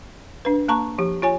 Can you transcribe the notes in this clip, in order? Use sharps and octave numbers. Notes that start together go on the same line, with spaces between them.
D4 B4
A#3 A5 A#5 C#6
F3 G4
F4 C#5 G#5